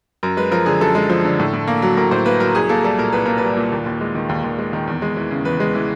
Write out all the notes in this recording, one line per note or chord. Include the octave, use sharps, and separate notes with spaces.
F#2 A#4
G#3 B4
F3 A#4
D3 G#4
F#2 A4
G#3
F3
D3
A2
A2
A#3
F#3
A2 A#4
A2 C5
A#3 B4
F#3 A#4
C2 G#4
A#3 A4
G3 A4
A#2 A#4
C2 B4
A#3 A#4
G3 B4
A#2
D#2
D#2
G#3
D#3
D#2
D#2
G#3
D#3
E2
G#3
E3
C#3
E2 B4
G#3
E3